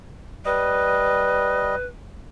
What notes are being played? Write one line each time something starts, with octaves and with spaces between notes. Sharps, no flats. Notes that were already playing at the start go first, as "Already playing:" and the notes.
G3 B4 D#5